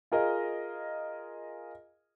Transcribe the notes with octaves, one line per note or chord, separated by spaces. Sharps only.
F4 G#4 A#4 D#5